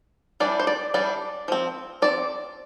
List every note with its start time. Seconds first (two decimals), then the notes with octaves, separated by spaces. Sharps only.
0.40 E3 G3 D4 D5
0.59 C5
0.67 D5
0.94 E3 G3 D4 D5
1.48 F3 C4
2.02 F3 C4 D5